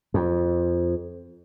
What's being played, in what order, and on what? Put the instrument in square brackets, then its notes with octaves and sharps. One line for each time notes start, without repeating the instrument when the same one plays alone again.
[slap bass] F2